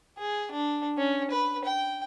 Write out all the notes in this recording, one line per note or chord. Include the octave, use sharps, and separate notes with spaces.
G#4
D4
C#4
B4
G5